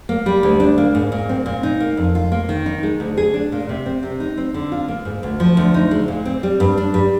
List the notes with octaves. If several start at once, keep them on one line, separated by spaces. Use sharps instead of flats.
A#3
G3
D2
D4
A#3
G#2
A#2
C4
A#2
D#4
A#3
F2
F4
A#3
D#3
D#4
G#3
D2
G#4
D4
A#2
C3
C4
C3
D#4
C4
D3
F4
A#3
G#2
D2
F3
D2
D#4
G#3
A#2
C4
G3
G2
D4
G3